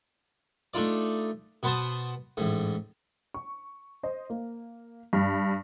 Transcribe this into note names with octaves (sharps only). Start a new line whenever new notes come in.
A3 D4 D#4 F4 D5
B2 B3 C5 A5 D#6
A1 G#2
C#6
C5 D#5
A#3
G2